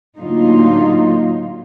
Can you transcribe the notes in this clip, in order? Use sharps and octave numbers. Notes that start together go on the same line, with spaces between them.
A2 D3 F#3 A#3 D#4 F4